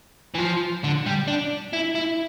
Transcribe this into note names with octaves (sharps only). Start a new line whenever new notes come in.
E3
F3
D3
G3
D4
E4
E4